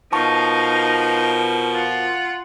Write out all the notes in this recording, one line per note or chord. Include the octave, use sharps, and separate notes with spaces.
B2 F3 D#4 A#4 F5 A5 C#6
F4 F#5